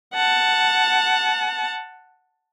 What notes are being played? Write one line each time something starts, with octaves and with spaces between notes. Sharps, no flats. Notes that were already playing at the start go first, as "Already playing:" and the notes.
F#5 A5